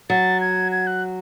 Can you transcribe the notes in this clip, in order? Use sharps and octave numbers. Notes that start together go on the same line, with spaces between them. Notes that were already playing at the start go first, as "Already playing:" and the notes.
F#3 A6
G#6
G#6
F#6